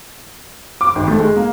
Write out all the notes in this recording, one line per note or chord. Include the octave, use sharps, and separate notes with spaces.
D6
G#1
A3
G#3
A#3